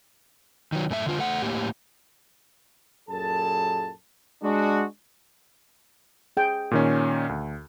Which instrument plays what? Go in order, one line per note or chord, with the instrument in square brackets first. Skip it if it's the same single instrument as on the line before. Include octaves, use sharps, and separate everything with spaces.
[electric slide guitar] D#3 F#3
F#2 A2 A3 G4 E5
D3 F4
A3 F#5
A2 A#3 G4
[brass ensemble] F#2 A#2 G#4 A4 A5
G#3 D4 F#4
[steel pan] G#4 G5
[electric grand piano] A#2 D#3 C#4
D2